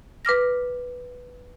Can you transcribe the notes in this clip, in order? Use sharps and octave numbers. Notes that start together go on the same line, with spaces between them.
B4 D6 F6 A#6